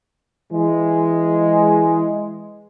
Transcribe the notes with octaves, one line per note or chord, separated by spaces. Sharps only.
E3 G#3